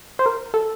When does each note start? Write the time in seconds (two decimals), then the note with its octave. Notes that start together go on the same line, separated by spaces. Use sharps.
0.19 C5
0.26 A#4
0.54 A4